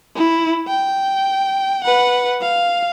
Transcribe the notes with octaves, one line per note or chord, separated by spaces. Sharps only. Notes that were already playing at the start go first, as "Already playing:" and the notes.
E4
G5
B4 F#5
F5